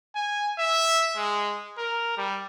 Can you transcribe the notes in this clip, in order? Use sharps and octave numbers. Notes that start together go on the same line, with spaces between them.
G#5
E5
G#3
A#4
G3